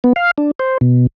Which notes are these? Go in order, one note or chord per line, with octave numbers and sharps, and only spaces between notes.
B3
F5
D4
C5
B2